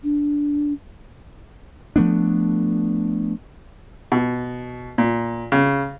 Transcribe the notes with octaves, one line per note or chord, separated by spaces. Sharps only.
D4
F3 A3 B3 D4
B2
A#2
C#3